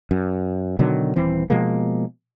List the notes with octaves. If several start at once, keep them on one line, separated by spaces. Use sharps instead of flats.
F#2
B2 D3 D#3 F#3
D#1 E3 C4
B2 F3 G#3 A#3